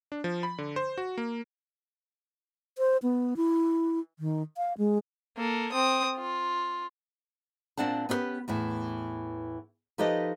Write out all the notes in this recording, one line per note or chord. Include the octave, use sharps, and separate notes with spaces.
D4
F3
B5
D3
C5
F#4
A#3
C5
B3
E4
D#3
F5
G#3
A#3 A4
C4 D#6
F4
A#2 B3 C4 D4 F#5 A5
B3 C#4 E4 G4 B4
E2 A2 E3
F3 D#4 G4 A4 B4 D#5